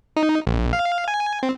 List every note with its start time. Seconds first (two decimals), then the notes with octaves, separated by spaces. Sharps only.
0.17 D#4
0.47 A#1
0.73 F5
1.08 G#5
1.43 C4